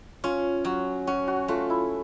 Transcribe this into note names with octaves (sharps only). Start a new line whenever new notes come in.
C#4 F4
F#3 F#4
C#4 F#4
F#4
A3 F4
E4